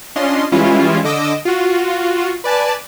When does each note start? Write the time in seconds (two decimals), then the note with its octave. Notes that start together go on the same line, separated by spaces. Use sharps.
0.16 C#4 D4 F4 D#5 C6
0.52 E3 G3 G#3 C#4 E4 F4
1.04 D3 D#5 D6 E6
1.45 F4 F#4
2.44 B4 D5 G#5 A5